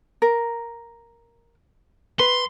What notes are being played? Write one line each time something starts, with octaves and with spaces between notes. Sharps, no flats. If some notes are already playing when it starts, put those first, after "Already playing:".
A#4
B4 C6